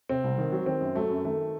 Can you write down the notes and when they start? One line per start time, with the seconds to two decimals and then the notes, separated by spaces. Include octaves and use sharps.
0.09 C3 C4
0.24 C2
0.38 D#3
0.52 F#3
0.66 D#3 C4
0.81 F#2
0.95 F#3 A3
1.10 F#2
1.25 D#3 A3